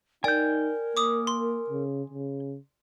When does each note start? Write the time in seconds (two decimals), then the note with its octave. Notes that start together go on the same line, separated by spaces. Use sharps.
0.24 D#4 A#4 D5 G5 G#5 G6
0.97 A#3 D6 D#6
1.27 C6
1.70 C#3
2.10 C#3